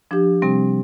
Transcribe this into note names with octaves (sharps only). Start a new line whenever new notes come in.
F3 D4 G4
C3 G3 C4